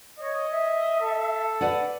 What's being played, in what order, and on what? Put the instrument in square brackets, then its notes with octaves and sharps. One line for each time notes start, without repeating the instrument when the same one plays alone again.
[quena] C#5 [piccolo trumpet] D#5
[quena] E5
[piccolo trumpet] A4
[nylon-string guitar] B4 D5 F#5